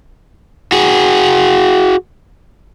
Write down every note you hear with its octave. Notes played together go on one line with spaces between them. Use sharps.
F#4 G#4